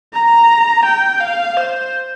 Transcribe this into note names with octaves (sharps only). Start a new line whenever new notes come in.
A#5
G5
F5
C5